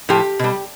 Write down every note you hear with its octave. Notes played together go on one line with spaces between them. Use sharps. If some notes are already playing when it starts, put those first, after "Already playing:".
A2 F3 G4
B2 G3